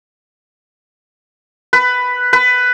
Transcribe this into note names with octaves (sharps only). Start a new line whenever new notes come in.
B4
B4